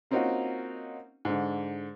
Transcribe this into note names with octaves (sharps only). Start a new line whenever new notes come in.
A#3 C4 C#4 D#4 F4 F#4
G#2 D3